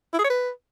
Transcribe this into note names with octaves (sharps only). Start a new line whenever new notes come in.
E4
G#4
C#5
B4